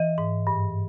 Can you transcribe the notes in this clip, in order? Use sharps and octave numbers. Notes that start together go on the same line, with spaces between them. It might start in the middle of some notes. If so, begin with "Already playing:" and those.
Already playing: E3 D#5
G#2
G2